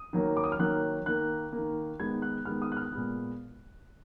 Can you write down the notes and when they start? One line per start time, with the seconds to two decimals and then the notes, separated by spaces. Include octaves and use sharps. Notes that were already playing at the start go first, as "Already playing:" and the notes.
Already playing: D#6
0.13 D#3 F#3 A#3
0.37 D6
0.44 D#6
0.52 F6
0.59 D#3 F#3 A#3 F#6
1.06 D#3 A#3 F#6
1.52 A#3
1.58 D#3
2.00 D#3 G#3 B3 G#6
2.22 F#6
2.45 D#3 G#3 B3 F6
2.62 D#6
2.72 F#6
2.77 F6
2.92 A#2 G#3 B3